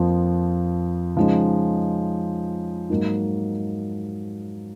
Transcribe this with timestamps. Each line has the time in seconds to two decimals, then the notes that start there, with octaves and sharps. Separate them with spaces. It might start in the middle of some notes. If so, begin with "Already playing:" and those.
Already playing: F2 F3 A#3
1.16 C#3 F3 G#3 D#4
2.90 G#2 F#3 A#3 D#4